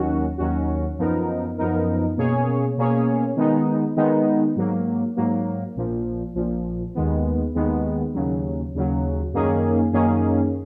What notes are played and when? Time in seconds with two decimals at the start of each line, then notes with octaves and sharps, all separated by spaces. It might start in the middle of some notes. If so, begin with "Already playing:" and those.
Already playing: D#2 D#3 F#3 C#4 F#4
0.38 D#2 D#3 F#3 C#4 F#4
0.98 F#2 F3 B3 D#4 A#4
1.58 F#2 F3 B3 D#4 A#4
2.17 B2 A#3 C#4 G#4 C#5
2.77 B2 A#3 C#4 G#4 C#5
3.36 D#3 G#3 B3 D#4
3.96 D#3 G#3 B3 D#4
4.56 G#2 F#3 A#3
5.16 G#2 F#3 A#3
5.75 A#1 A#2 F3
6.35 A#1 A#2 F3
6.95 D#2 D#3 G#3 B3
7.55 D#2 D#3 G#3 B3
8.14 D#2 C#3 F#3
8.75 D#2 C#3 F#3
9.33 F#2 D#3 A#3 C#4 G#4
9.93 F#2 D#3 A#3 C#4 G#4